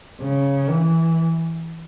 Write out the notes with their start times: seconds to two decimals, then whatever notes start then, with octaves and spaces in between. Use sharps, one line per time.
0.21 C#3
0.70 E3